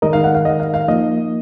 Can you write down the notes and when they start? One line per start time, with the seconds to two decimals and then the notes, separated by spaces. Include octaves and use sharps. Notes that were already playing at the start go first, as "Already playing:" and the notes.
0.02 D#3 G#3 D#4 A#4 D#5
0.13 F5
0.24 F#5
0.35 F5
0.45 D#5
0.60 F5
0.74 F5
0.88 F3 A#3 D#4 D#5